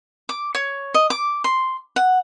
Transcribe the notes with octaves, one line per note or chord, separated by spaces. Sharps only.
D6
C#5
D#5
D6
C6
F#5